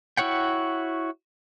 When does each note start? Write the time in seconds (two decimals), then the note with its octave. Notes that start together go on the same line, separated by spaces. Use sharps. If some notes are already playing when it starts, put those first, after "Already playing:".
0.17 E4 F#4 C#5 F#5 G5